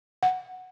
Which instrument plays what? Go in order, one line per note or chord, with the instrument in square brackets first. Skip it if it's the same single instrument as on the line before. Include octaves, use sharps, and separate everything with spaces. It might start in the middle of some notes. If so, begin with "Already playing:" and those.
[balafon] F#5